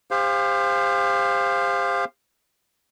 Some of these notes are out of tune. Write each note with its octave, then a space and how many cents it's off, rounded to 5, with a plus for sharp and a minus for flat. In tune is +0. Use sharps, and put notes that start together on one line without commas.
G4 +40 C5 +0 F5 +0